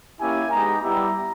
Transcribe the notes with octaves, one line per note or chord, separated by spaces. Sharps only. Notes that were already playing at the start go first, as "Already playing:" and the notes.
A#3 C#4 E4 G4 G#5
G#3 B3 D#4 G4 A#5
G3 B3 E4 G4 A#5